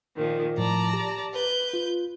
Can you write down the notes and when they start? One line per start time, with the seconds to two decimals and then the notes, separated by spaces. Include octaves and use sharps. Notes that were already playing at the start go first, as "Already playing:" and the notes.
0.16 A#2 D#3 F3
0.58 A2 F3 D5 A5 A#5
0.93 G4
1.34 B4 G6
1.74 F4